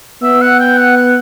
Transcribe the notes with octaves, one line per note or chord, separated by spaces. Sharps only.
B3 E5
F#5
G5
F#5
F#5